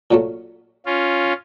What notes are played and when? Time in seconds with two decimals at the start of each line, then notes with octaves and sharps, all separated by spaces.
0.11 A#2 F#3 A3
0.86 C#4 F4